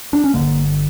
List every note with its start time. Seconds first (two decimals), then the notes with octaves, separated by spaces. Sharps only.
0.13 D4
0.24 C#4
0.34 G1 F2 D3 A#3